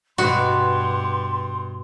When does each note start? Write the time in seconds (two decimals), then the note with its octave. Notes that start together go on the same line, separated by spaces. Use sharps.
0.18 G2 B2 F#4 C6